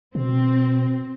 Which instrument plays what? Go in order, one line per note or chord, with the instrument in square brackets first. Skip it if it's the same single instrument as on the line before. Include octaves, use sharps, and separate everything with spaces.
[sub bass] B2 [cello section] C4